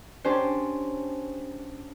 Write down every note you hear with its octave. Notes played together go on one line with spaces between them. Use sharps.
C#4 D4 G4 C5